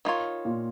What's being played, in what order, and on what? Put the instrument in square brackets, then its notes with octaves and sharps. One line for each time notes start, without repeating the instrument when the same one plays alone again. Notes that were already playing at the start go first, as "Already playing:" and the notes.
[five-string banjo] D#3 A#3 F4 C#5
[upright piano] A#2